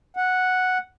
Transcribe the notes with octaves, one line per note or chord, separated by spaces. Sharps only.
F#5